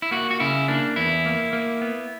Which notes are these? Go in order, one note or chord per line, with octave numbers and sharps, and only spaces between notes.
E4
A#3 F#4
F#4
C#3 E4
A#3 D4
E2 E4
A#3
A#3
B3